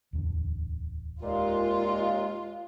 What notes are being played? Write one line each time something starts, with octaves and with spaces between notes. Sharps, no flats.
D1 E2 D3
D#2 A#2 G#3 F4